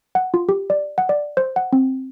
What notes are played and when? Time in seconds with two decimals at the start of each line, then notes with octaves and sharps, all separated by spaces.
0.15 F#5
0.34 F4
0.49 G4
0.70 D5
0.98 F#5
1.09 D5
1.37 C5
1.56 F#5
1.73 C4